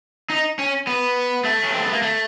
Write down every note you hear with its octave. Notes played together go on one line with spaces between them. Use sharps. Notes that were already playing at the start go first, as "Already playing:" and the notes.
D#4
C#4
B3
A3
C#4
C4
B3
A#3
A3